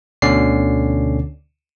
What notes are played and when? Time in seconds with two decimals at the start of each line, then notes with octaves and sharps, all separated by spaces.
0.22 D2 B2 D3 C#4 D5 C7